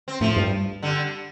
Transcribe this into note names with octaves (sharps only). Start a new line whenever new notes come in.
C4
A2 F3 A3
G2
D3 G3